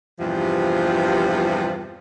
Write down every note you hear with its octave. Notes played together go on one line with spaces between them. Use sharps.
E2 G2 C3 F3